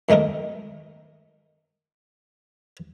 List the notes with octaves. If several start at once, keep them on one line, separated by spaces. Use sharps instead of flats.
F#2 D#3 A3 D#4 A#4